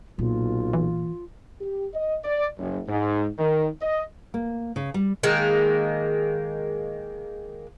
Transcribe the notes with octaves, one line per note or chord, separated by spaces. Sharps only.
B1 A#2 F4
E3
G4
D#5
D5
F#1
G#2
D#3
D#5
A#3
C#3
G3
D#3 G#3 A#3